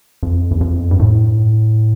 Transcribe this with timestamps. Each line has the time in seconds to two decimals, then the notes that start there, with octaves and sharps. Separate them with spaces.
0.23 F2
0.51 E2
0.61 F2
0.91 G2
0.99 A2